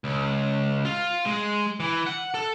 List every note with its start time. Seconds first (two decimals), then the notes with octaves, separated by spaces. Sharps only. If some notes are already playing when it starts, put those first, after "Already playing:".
0.04 C#2
0.85 F4
1.26 G#3
1.80 E3
2.06 F#5
2.34 A4